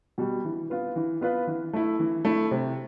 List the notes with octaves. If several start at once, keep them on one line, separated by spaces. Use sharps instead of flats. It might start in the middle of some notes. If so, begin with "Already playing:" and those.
B2 G3
E3
B3 F4 B4
E3
B3 F4 B4
E3
A3 E4
E3
A3 E4
C3